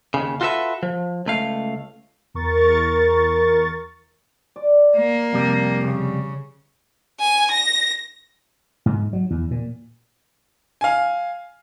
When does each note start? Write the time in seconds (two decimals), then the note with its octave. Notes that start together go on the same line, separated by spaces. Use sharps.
0.14 D#2 C#3
0.41 F4 F#4 A4 B4 E5
0.83 F3
1.26 C#2 A3 F5
2.34 E2 A#4 C#6 A6
4.56 D5
4.97 A#3
5.33 F2 C3 G3
5.85 C#3
7.18 G#5
7.50 A#6
8.86 G#2
9.13 F#3
9.30 E2
9.51 A#2
10.81 F5 G#5